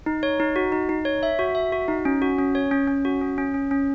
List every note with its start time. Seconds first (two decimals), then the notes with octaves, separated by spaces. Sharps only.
0.06 D#4
0.23 C#5
0.40 D#4
0.56 F#4
0.72 D#4
0.89 D#4
1.05 C#5
1.23 E5
1.39 F#4
1.55 E5
1.72 F#4
1.88 D#4
2.05 C#4
2.22 F#4
2.39 C#4
2.55 C#5
2.71 C#4
2.88 C#4
3.05 F#4
3.21 C#4
3.38 C#4
3.54 C#4
3.71 C#4